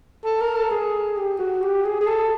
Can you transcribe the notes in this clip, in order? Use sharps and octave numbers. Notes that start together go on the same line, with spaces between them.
A4
A#4
A4
G#4
G4
F#4
G4
G#4
G#4
A4